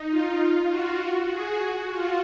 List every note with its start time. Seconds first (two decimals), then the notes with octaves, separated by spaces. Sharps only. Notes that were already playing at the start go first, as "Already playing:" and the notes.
Already playing: D#4
0.10 F4
0.70 F#4
1.01 F#4
1.31 G#4
1.61 F#4
1.91 F4